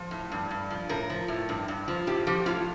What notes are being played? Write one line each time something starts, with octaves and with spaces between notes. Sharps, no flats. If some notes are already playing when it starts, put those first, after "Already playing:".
Already playing: F3
A2
G2
G2
F3
A2 A#4
F3
A2
G2
G2
F3
A2 G4
F3 G4
A2 F4